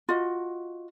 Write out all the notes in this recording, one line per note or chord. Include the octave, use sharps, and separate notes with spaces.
F4 F#4 D#5